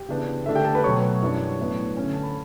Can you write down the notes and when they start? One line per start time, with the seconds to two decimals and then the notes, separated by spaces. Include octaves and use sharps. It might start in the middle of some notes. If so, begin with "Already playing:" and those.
Already playing: G4 G5
0.09 C#3 E3 B3 D4
0.46 D3 A3 D4 E5
0.55 G4 G5
0.65 A4 A5
0.75 B4 B5
0.84 B2 F#3 A3 C#5 C#6
1.22 F#2 E3 G3 D4
1.59 A2 F#3 B3 D4
1.97 D3 A3 C#4
2.13 A5
2.23 B5